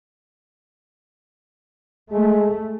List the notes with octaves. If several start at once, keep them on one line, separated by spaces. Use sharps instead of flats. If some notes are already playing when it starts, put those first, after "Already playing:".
G#3 A3